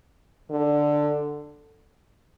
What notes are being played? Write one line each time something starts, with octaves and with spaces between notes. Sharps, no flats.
D3